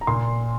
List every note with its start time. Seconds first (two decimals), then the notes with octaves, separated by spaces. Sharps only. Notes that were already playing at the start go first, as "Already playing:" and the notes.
0.01 A#5
0.07 A#2 C6